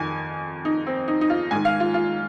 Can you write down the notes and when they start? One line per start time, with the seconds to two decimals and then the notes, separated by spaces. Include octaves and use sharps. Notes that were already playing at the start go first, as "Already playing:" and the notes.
Already playing: F2 D#3 G#5
0.65 D#4
0.87 C4
1.08 D#4
1.21 D#4
1.30 F4
1.51 G#2 D#3 G#5
1.65 F5
1.80 F4
1.94 F4